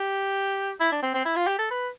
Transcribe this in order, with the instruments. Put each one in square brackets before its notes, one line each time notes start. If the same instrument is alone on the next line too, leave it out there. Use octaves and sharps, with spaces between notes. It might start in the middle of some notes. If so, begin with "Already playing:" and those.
Already playing: [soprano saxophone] G4
E4
D4
C4
C4
E4
F4
G4
A4
B4